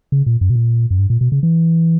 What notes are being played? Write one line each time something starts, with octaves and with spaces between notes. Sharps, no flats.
C#3
A#2
F#2
B2
A#2
F#2
G2
A#2
B2
C#3
E3